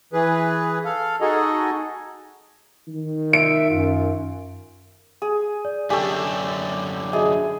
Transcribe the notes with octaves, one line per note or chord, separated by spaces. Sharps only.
E3 G#4 B4
A4 F5
D#4 F#4 G#4 A4 D#5
D#3
E5 D7
F#2 F4
G#4
D5
F#2 D3 D4 G4 A4 G#5 C#6
F#4 G#4 D#5 E5